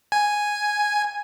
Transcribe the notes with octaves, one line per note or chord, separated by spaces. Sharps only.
G#5